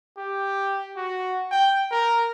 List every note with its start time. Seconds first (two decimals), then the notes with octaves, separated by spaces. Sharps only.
0.18 G4
0.97 F#4
1.51 G5
1.92 A#4